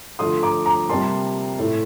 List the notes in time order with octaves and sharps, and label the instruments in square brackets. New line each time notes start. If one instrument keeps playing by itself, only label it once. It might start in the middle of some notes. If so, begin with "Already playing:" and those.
[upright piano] D3 F3 A3 C6 D#6
A#5 D6
A#5 D6
C3 G3 A#3 A5 C6
A2 A3